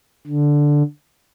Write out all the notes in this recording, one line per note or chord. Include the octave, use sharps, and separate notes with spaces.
D3